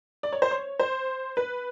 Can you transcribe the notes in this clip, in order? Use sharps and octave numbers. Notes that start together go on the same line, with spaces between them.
D5
C#5
C5
C#5
C5
B4